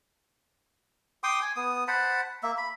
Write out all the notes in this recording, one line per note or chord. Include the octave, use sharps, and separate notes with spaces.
G5 C6 D6 D#6
G#5
B3 D#6
C5 F#5 A5 B5
A#3 E5
B5